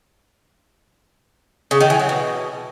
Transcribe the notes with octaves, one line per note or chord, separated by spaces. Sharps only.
C#3
D#3
E3
F#3
B2